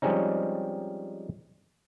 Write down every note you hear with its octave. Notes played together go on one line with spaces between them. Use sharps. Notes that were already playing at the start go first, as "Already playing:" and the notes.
F3 G3 G#3 C4 C#4 D#4